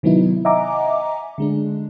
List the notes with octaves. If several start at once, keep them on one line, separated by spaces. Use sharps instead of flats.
C3 D#3 F#3 B3 D#4 E4
D#5 E5 F#5 G#5 A#5 D6
D3 G#3 D4